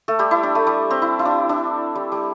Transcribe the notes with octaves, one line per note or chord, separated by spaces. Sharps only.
A3 A4
G3 G4
E4
D4
A3
G3
C4
E4
E4
D4
D4
G3
G3